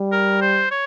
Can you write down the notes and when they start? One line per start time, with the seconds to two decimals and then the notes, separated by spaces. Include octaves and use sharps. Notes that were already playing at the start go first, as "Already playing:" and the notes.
Already playing: G3
0.12 A#4
0.41 C5
0.71 C#5